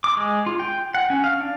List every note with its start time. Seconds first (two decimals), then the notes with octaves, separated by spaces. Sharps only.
0.04 D6
0.17 G#3
0.46 F4
0.60 G5
0.94 F#5
1.10 C#4
1.24 F5
1.41 D4